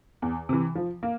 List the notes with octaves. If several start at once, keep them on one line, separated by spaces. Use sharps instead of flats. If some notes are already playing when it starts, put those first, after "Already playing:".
E2
C3 E3
F3
A#3